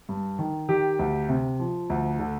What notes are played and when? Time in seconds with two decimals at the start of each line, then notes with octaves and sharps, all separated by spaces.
0.09 G2
0.39 D#3
0.68 D#3 G4
0.99 D2
1.29 C3
1.59 F3
1.90 D2
2.19 D3